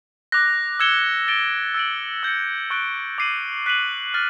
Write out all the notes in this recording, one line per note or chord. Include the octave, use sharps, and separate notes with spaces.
D6 F#6 A#6
E6 G#6 C#7 E7 G7
A6 D7 G7
E6 A6 D7 F#7
E6 G6 A#6 C#7
C#6 F#6 A6 D7 G7
D6 G6 C7 D#7 F#7
F#6 B6 D#7 F#7
F6 A6